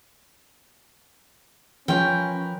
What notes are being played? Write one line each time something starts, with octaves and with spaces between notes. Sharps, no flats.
F3 C#4 A#4 B4 G5